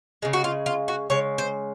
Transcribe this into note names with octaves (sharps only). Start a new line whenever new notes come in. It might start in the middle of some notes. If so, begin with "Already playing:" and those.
C#3 G#3
F#4
F4
F4
F#4
C#3 G#3 C#5
C5